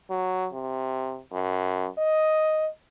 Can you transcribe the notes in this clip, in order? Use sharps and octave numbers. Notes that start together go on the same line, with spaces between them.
F#3
C3
F#2
D#5